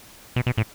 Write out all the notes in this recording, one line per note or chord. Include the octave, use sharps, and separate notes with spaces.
B2
B2
A2